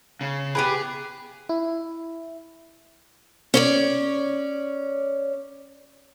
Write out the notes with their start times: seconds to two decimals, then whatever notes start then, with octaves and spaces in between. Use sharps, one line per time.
0.21 C#3
0.55 B3 G4 G#4 B4
1.49 E4
3.54 C#4 C#5 D5